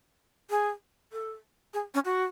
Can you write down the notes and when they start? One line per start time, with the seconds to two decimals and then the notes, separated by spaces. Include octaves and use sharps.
0.50 G#4
1.12 A4
1.74 G#4
1.94 C#4
2.05 F#4